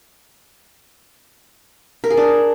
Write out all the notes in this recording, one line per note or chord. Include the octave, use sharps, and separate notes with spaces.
A#4
G#4
D4